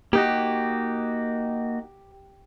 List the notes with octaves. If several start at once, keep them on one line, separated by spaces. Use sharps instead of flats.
A#3 D#4 F#4 G4